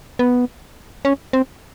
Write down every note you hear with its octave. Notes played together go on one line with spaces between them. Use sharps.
B3
C#4
C4